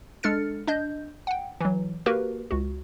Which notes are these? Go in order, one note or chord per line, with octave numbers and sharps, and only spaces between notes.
G#3 D4 A4 F6 A6 C#7
D4 D#5 G6
F#5 G5
E3 F#3
A#3 F#4 G4 A#4 B4
C#2 F#4